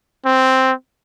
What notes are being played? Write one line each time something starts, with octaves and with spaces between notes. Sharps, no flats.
C4